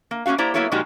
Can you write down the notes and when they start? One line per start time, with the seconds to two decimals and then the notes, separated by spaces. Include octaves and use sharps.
0.11 A#3
0.26 A#3 C#4 D#4 F#4 F5
0.38 A#3 E4 G4 C5 D5 A#5
0.54 F#3 A#3 B3 E4 A4 C#5
0.72 A#2 F3 G#3 D#4 F#4 G4